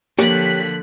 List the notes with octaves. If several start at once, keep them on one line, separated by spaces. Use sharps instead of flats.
D3 F3 A#3 G4 C#5 F#6 B6